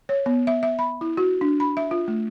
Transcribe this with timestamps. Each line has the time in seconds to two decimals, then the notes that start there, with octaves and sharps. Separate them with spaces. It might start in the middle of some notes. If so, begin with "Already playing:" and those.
0.09 C#5
0.26 B3
0.47 E5
0.63 E5
0.79 B5
1.01 E4
1.17 F#4
1.41 D4
1.60 B5
1.77 E5
1.91 F4
2.08 A3